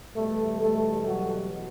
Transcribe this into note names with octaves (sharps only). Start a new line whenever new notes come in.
E2 B2 G3 A3 A4
A3 A4
F#3 F#4